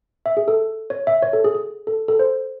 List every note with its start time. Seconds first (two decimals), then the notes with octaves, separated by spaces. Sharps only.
0.26 E5
0.37 G#4
0.48 A4
0.90 C#5
1.07 E5
1.22 C#5
1.33 A4
1.44 G#4
1.55 G#4
1.87 A4
2.08 A4
2.19 C5